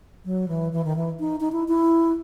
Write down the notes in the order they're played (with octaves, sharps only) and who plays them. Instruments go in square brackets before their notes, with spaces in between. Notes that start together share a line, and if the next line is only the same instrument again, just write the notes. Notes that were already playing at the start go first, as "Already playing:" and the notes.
[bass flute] F#3
E3
E3
D#3
E3
D#4
D#4
E4
E4